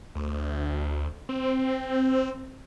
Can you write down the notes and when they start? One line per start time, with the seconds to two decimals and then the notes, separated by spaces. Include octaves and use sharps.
0.15 D2
1.29 C4